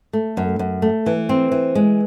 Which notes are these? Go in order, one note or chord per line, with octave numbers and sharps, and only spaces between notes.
A3
F#2
F#2
A3
E3
C4
E3
G#3